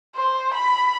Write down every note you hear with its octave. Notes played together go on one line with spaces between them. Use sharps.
C5
B5